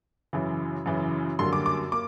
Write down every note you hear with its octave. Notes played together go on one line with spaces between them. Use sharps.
F#2 C#3 E3
F#2 C#3 E3
F#2 D3 G3 A#3 C6
D6
D6
A#3 D6